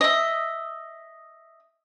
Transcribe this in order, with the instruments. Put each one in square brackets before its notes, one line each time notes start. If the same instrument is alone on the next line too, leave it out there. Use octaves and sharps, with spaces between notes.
[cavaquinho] D#5 E5